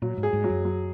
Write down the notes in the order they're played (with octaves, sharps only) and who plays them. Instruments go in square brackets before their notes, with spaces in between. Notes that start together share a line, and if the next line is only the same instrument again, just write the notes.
[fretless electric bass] A#2 [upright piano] F#3
[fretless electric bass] G#2
[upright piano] G#4
[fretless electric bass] G#2
[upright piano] F#3
[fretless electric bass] F#2
[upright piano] F#3